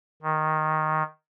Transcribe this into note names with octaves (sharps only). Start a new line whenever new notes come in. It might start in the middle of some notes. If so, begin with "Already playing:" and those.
D#3